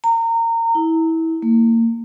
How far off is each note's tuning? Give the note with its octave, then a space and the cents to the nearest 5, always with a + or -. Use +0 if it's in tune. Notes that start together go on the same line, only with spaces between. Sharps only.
A#5 -25
E4 -25
A#3 -30